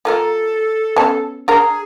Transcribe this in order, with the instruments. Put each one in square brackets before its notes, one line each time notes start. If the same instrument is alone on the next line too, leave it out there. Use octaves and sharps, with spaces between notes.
[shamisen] A#3 F4 A#4 [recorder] A4
[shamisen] B3 C#4 A5
[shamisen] D4 A#4 A#5 [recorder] G#4